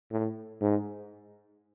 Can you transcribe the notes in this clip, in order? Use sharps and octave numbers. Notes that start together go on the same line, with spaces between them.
A2
G#2